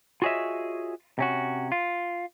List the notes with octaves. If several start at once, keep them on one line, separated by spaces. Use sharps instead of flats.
F4 F#4 G#4 C#5 D#5 E5
C3 C#4 F#4
F4